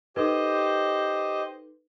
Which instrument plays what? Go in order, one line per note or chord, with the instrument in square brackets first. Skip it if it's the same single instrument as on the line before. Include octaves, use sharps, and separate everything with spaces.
[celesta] D#4 A4 B4 [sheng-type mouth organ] G4 C5 D#5